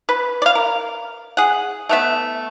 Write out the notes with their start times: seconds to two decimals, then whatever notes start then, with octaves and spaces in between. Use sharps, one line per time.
0.09 B4
0.42 D5 F5
0.55 A#4
1.37 G#4 F#5
1.89 A3 B3 E5